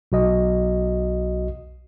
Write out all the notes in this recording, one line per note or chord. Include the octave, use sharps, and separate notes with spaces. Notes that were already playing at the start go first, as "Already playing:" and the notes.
B1 F#4 D#5